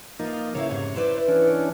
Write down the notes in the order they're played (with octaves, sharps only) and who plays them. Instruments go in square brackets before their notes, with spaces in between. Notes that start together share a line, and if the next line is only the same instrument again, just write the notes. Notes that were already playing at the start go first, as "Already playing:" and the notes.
[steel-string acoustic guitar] F3 F4 [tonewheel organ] A#3 D#4
[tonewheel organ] C#3 C#5 [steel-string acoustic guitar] A#3 E4 F5
[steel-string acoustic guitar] F2 G#2 C3
[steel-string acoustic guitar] E4 B4 D5 [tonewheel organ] C5
[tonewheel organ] E3 C#4 D4